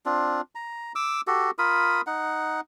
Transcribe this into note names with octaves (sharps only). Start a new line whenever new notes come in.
C4 D4 F4
A#5
D6 E6
F#4 G4 A4
F4 A#4 B5 D#6
D#4 F#5